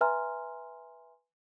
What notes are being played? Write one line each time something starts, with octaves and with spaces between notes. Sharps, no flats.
B4 E5 G#5 A#5 C6 F6